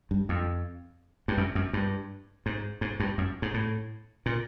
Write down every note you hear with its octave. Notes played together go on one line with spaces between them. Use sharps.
G2
F2
G2
F#2
F#2
G2
G#2
G#2
G2
F#2
G#2
A2
A#2